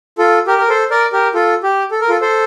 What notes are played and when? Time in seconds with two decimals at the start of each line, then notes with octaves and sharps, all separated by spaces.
0.18 F4 A4
0.47 G4 A#4
0.58 A#4
0.68 A4 C5
0.90 A#4 D5
1.12 G4 A#4
1.34 F4 A4
1.63 G4
1.91 A4
2.01 A#4
2.09 F4 A4
2.21 A4 C5